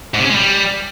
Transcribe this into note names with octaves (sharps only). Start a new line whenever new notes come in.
G#2
C3
C#4
G#3
G3